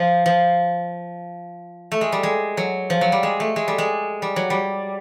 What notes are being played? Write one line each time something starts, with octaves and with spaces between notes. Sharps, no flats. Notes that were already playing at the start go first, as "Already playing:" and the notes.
Already playing: F3
F3
A3
G#3
G3
G#3
F#3
F3
F#3
G3
G#3
A3
G#3
G3
G#3
G3
F#3
G3